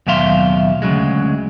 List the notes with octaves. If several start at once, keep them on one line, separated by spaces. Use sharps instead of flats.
D#2 B2 F#3 E5 F5 C6
D2 C#3 F#3 G#3